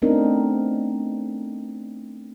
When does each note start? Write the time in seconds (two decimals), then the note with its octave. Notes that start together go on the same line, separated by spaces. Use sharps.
0.02 A3 B3 C4 D4 D#4 A#4